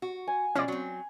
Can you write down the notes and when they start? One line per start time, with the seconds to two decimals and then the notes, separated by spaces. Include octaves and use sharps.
0.02 F#4
0.28 G#5
0.55 B2 F3 G#3 C#4 D5
0.68 F#3 C4